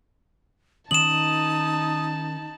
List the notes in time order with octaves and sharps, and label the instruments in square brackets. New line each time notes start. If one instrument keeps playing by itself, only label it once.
[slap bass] D#3 C#4 [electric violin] D#4 A5 [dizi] D#6 [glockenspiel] E7 F#7